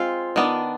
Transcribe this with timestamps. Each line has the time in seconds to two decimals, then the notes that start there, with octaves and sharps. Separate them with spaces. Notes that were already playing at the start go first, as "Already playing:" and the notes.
Already playing: G#3 C4 F4
0.36 D#3 B3 D4